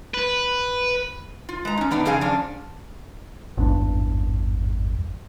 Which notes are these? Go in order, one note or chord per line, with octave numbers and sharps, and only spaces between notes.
B4
F4
G#3 A#5
C#4 D#4
E3 B3 D4 D#4
F2 C#3 C4 G#4 F5 G#5
F3 C#4 D4
G#1 E2 G2 D4